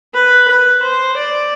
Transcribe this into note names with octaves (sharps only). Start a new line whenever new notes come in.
B4
B4
C5
D5